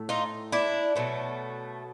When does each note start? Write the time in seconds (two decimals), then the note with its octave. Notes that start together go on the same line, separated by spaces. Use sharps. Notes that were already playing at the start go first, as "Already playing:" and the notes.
Already playing: A2 A3
0.09 D#4 F4
0.52 D4 E4
0.95 B2 F#3 A3